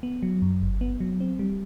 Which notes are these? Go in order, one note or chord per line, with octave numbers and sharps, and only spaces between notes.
B3
F#3
F#2
G1
B3
F#3
C4
G3